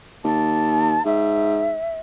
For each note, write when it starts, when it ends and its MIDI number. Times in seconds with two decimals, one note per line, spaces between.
0.24 0.98 39
0.24 1.04 81
1.05 1.74 44
1.05 1.99 76